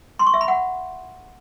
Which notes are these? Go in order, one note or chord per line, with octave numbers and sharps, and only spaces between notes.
C6
C#6
E5
B5
F#5